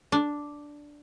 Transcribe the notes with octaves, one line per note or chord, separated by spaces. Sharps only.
D4